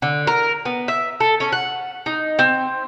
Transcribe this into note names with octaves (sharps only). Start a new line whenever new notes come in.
D3
A#4
B3
E5
A4
C#4
F#5
D#4
C4